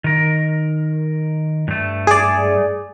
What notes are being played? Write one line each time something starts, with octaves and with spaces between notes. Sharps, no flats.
D#3 A#4
G2 A3
G#4 D5